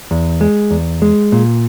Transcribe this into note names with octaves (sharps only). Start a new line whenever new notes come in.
E2
G#3
E2
G#3
A#2